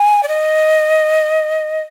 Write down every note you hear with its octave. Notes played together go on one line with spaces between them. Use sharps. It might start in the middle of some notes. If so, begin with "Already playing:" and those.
Already playing: G#5
D5
D#5